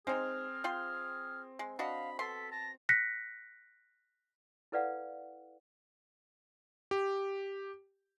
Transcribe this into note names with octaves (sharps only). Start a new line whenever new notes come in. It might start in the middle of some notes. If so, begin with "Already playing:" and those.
G#3 C4 D#4 G#4 F6
F4 G5 C6
G#3
D4 F#4 D#5 F5 B5
B2 A4 C6 B6
A5 A#6
F#6 A#6 B6 C#7
E4 A4 B4 D5 F5 F#5
G4